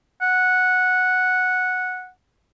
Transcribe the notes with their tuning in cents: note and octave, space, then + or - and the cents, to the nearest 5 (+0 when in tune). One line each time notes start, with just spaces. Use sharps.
F#5 -10